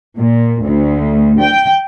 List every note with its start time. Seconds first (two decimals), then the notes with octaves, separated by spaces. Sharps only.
0.17 A#2
0.62 D2
1.39 G5